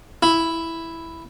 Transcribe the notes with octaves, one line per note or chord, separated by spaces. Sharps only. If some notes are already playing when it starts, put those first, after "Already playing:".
E4